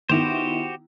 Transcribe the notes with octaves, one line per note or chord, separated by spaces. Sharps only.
D#3 B3 E4 F#4 G4 C5